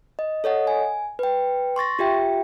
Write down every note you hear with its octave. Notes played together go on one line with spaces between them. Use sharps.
D#5
A4 C#5 D#5 F#5
G#5
B4 G5
C6 C#6 A6 A#6
F4 G4 E5 G5